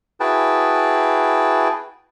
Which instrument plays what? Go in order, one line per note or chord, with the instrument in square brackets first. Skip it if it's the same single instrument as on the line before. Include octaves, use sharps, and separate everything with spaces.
[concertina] E4 F#4 G#4 B4 G5 A5